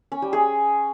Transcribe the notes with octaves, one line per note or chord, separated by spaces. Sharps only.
C#4
G3
G#4